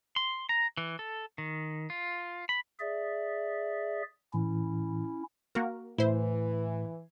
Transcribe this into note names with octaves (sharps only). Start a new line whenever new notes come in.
C6
A#5
E3
A4
D#3
F4
B5
G#4 D5 E5
A2 E3 C#4 E4
A#3 F#4 A#4
A2 E3 E4 C5